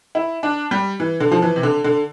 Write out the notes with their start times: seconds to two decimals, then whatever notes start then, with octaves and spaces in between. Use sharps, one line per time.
0.15 E4
0.43 D4
0.71 G3
1.00 E3
1.20 D3
1.31 F3
1.42 E3
1.56 C3
1.63 D3
1.84 D3